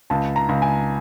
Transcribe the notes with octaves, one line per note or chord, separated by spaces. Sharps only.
C#2 A5
A#5
C#2
G#5